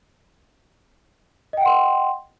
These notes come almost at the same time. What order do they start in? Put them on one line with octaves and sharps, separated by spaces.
D#5 G5 F#5 C6